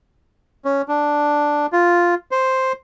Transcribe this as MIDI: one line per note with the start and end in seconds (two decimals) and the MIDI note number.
0.65 0.82 61
0.88 1.66 62
1.73 2.15 65
2.31 2.72 72